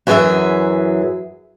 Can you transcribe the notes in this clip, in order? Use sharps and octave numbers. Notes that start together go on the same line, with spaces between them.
F#2 E3 F#3 G#4 E5